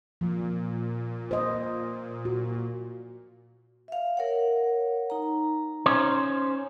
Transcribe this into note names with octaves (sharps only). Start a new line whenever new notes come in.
A#2 F3
C5 D#5
F#4
E5 F5
A#4 C#5 F#5
D#4 A#5
C#4 C5